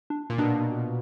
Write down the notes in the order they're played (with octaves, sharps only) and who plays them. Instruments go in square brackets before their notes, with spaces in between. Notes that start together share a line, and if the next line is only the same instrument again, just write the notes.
[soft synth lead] D4
[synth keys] A#2
[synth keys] B2 [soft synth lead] D4